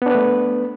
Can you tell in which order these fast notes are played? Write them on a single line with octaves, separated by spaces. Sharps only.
B3 D4 B4 A3